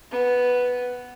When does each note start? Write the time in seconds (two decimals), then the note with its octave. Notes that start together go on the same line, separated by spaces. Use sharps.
0.12 B3